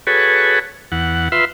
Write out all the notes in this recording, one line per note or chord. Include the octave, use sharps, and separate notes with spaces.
F#4 G#4 A4 B4 C#5
E2 F#5
F4 B4 E5 C6